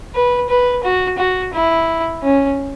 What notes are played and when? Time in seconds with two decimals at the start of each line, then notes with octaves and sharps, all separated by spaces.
0.15 B4
0.50 B4
0.84 F#4
1.18 F#4
1.54 E4
2.23 C#4